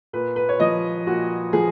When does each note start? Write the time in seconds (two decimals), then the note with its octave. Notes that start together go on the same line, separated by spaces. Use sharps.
0.13 A#2 B4
0.36 B4
0.49 C#5
0.60 F3 D#5
1.07 A#2 F#4
1.53 F3 G#4